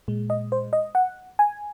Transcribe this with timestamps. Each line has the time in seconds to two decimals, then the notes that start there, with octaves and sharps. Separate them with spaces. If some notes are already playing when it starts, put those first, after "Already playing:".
0.08 A#2 G#3
0.30 D#5
0.52 C5
0.73 D#5
0.95 F#5
1.39 G#5